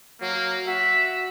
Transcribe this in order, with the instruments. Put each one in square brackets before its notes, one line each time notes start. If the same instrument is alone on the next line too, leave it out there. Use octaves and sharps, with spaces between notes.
[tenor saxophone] F#3 [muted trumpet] A#3
[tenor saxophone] F#4 [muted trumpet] E5